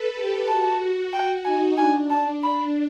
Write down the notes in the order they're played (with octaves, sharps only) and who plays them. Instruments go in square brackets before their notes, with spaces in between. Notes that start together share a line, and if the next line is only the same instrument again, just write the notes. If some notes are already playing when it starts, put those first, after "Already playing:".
Already playing: [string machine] A4 B4
G4
[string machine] F#4 [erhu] A5
[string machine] F#4 [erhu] G5
[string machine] D#4 [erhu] G#5
[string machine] D4 [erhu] G#5
[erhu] A5
B5